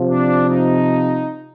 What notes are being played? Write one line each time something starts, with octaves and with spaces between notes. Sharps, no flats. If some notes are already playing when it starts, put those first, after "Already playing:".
Already playing: C3 F3
D4
D#4